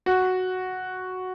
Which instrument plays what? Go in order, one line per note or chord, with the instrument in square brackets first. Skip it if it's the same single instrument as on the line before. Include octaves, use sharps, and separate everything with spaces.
[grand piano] F#4